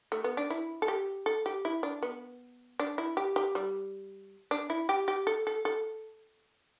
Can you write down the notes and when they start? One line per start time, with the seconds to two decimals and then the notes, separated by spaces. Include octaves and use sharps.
0.12 A3
0.24 B3
0.37 D4
0.50 E4
0.82 A4
0.88 G4
1.26 A4
1.46 G4
1.65 E4
1.83 D4
2.03 B3
2.79 D4
2.98 E4
3.17 G4
3.36 G4
3.55 G3
4.51 D4
4.70 E4
4.89 G4
5.08 G4
5.27 A4
5.47 A4
5.65 A4